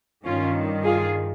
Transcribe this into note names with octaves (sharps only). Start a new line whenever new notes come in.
G2 D#3 C#4 F4
F4 G#4